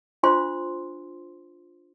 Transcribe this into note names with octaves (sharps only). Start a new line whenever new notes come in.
D4 F4 C5 C6